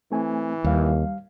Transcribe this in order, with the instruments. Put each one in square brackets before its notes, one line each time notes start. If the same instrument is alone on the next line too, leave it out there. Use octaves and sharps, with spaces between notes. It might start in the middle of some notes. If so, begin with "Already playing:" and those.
[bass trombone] E3 [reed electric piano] A3 C4 G#5
[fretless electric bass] D#2 [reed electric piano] G3 F5